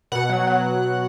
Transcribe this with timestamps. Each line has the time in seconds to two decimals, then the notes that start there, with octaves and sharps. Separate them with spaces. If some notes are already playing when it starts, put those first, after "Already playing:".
0.12 B2 F#5
0.29 F#3
0.47 F#3